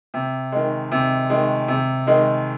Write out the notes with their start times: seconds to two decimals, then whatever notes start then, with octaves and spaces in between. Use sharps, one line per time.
0.14 C3
0.52 D#3 G#3
0.92 C3
1.30 D#3 G#3
1.68 C3
2.07 D#3 G#3